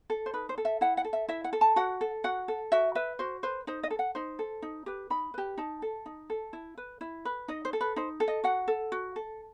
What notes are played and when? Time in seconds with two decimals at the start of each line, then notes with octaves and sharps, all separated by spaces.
0.10 A4
0.26 C5
0.34 D#4 B4
0.49 C5
0.58 A4
0.65 E5
0.81 E4 F#5
0.97 F#5
1.05 A4
1.13 E5
1.28 E4 E5
1.44 F#5
1.53 A4
1.61 A5
1.76 F#4 F#5
2.01 A4
2.24 F#4 F#5
2.48 A4
2.72 F#4 E5
2.95 B4 E5
3.19 F#4 C5
3.43 B4 C5
3.67 D#4 C5
3.83 D#5
3.91 A4
3.99 F#5
4.15 D#4 C5
4.39 A4
4.62 D#4
4.86 G4 B4
5.10 D#4 B5
5.34 G4 B4
5.58 D#4 A5
5.82 A4
6.06 D#4
6.30 A4
6.53 E4
6.77 B4
7.01 E4
7.25 B4
7.48 D#4 D#5
7.65 C5
7.73 A4
7.81 B4
7.96 D#4 C5
8.20 A4
8.28 D#5
8.44 F#4 F#5
8.68 A4
8.92 F#4
9.16 A4